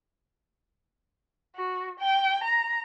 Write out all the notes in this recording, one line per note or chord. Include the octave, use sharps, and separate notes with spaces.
F#4
G5
A#5